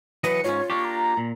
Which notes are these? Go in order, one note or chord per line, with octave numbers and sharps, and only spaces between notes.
E3 F#3 B4 D#5 C#7
G#2 C#4 F4 C#5
A#3 D4 G4 C#6
A#5
A#2